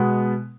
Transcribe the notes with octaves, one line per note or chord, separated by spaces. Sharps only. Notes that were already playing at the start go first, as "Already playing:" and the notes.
Already playing: B2 G#3 B3